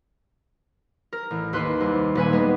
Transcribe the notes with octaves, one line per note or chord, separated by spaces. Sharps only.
A#4
A1
D#2 B4 C6 F#6
C2
D#1 B4 G#5
G3 G#3 B3